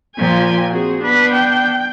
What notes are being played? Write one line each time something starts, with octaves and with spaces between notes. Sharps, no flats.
A#2 F3 G5 G#5
C4 F#4 G#4
B3 D4 B4
G5